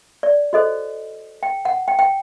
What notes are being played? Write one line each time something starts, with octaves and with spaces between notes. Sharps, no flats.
D5
F#4 A4 C5 D#5
G5
F#5
G5
G5